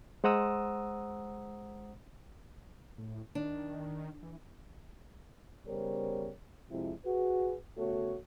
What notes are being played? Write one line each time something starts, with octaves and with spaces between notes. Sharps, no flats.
G#3 C5 F#5 A#5 D#6 E6
A2
D#3 D4
E3
C#3 G3 B3 A#4 C5 C#5
F2 C3 F3 G#3 E4
F#4 G#4 B4
C#3 A3 B3 F#4 A4 C#5